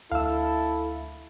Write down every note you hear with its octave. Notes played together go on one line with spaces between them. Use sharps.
D2 E4 A4 F5 E6